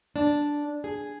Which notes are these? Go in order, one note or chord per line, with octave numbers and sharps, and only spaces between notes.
D4
G#4